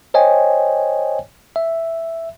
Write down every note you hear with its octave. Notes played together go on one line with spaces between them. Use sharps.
C5 C#5 D#5 G5 G#5
E5